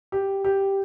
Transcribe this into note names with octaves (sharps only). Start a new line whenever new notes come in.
G4
G4